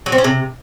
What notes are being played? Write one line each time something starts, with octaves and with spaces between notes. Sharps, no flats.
F#3
C4
C#4
C3